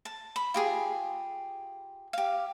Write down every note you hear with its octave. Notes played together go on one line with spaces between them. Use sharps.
A5
B5
F4 G4 G#4
G4 F5